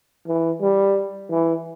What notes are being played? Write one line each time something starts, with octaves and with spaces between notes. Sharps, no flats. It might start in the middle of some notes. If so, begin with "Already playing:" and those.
E3
G3
E3